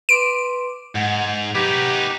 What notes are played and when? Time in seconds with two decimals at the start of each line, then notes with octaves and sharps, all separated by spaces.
0.09 B4 C6 D6 D7
0.95 G#2 F#5
1.55 D#4 G4 B4